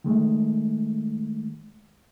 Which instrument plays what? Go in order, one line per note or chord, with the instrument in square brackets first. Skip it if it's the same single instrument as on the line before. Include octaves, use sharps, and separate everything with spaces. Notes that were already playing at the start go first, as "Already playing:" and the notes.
[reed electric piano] D#3 G#3 A3